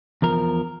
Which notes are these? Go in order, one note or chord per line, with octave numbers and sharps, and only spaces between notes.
E2 F3 A#4